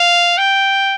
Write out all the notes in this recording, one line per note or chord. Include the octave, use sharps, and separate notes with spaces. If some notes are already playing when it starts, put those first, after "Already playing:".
Already playing: F5
G5